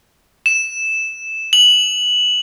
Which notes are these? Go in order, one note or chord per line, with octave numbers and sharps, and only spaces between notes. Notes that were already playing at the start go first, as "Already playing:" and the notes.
E7
F#7